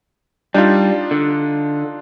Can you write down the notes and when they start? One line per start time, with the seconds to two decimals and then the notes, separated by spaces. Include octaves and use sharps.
0.54 G3 D4 D#4 F4
1.11 D3